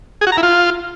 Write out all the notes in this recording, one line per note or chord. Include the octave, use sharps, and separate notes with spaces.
G#4
F#4
A#5
E4
F4